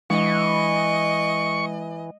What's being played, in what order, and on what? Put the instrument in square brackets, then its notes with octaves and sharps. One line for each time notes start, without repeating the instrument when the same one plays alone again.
[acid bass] E3 [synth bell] G#3 [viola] D#5 [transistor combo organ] C#6